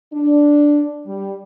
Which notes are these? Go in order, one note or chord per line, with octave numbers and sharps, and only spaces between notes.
D4
G3